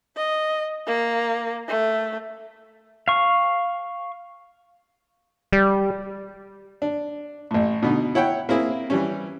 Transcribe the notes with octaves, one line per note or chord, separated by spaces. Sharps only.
D#5
A#3
A3
F5 C#6
G3
D4
A1 A2
B2 D3 D#4
E4 C#5 F#5 G5
A#3 C4 E4 G#4
E3 G3 C#4